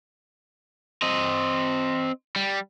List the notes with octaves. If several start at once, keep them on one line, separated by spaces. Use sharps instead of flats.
C4 D#5
G3